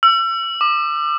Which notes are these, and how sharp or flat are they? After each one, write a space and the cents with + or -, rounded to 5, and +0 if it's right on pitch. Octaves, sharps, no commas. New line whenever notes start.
E6 +35
D6 +30